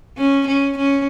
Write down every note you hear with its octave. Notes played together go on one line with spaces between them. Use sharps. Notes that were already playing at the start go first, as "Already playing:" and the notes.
C#4
C#4
C#4